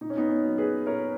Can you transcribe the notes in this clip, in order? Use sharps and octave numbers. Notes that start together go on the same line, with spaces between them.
A#2 D#4
C#4
B3 D#4
C#4
F#3
G#4 B4
A#2 A#4 C#5